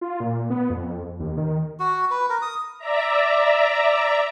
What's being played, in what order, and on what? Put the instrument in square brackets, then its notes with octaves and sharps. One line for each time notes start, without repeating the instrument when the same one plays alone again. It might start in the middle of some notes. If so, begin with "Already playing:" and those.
[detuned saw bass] F4
A#2
B3
F2
D#2
D#3
[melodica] F#4
B4
A#4
D#6
[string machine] D5 E5 A#5